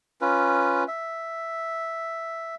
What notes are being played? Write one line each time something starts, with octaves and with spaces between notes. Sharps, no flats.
C#4 F4 B4
E5